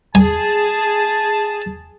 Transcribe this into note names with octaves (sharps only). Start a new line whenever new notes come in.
G#4 G#5 A5